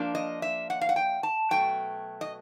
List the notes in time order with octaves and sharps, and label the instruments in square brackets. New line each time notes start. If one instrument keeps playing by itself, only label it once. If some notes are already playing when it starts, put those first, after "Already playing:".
Already playing: [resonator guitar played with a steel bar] F3 A#3 D4
D#5
E5
F#5
F5
F#5
G5
A5
B2 F#3 A3 G5
D#5